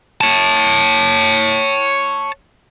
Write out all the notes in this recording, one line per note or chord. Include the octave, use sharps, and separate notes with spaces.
C#5 A5